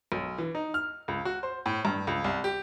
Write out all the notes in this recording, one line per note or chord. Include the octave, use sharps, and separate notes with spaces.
B1
E3
D#4
F6
C#2
F#4
C5
A2
G2
C#2
C2
G4